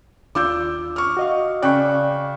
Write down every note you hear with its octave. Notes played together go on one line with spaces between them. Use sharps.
D#2 D4 F4 D6 E6 G6
C#6 F6
F#4 D#5 F5
C#3 D5 G5 C#6 F#6